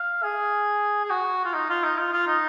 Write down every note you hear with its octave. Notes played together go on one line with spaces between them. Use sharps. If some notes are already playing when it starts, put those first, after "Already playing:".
Already playing: F5
G#4
G#4
F#4
F4
D#4
F4
D#4
F4
F4
D#4